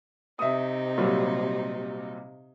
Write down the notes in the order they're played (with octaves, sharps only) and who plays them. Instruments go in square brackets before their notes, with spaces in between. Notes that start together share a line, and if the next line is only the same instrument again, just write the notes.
[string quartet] C3 D#4 [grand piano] E5 D#6
[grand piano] A#2 F#3 G3